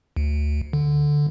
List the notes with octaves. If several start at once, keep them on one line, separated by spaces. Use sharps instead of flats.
D2
D3